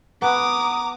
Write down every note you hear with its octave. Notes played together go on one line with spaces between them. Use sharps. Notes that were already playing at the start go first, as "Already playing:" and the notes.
B3 B4 A#5 D6 D#6